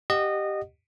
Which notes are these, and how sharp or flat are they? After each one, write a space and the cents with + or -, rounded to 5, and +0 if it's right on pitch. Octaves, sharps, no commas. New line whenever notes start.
G4 +0 D#5 -20 F#5 +0